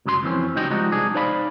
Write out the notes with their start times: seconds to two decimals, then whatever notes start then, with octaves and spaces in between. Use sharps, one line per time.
0.06 C#2 F#2 F#3 F#4 C6
0.23 F2 E3 C4 C#4
0.55 C#2 G3 D#4 F#4 D#5 G5
0.70 F3 G3 G#3 D#4 F#4
0.92 C2 D4 G#4
1.14 D#4 C5 D5 F5 A5 B5